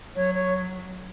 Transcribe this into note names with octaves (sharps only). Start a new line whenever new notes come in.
F#3 C#5
C#5